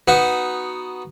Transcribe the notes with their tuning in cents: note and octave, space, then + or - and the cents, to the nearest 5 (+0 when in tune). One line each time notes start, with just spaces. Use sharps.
B3 +0 D#4 +0 F#4 +0